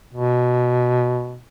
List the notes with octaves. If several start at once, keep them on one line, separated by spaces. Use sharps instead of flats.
B2